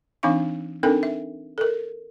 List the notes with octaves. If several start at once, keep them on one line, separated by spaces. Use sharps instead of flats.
E3 C4 D4 D#4 F5 C#6
C4 D4 D#4 A4 A#4 G5
E5
A4 A#4